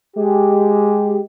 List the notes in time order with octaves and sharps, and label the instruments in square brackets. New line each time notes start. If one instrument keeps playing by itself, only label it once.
[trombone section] G#3 G4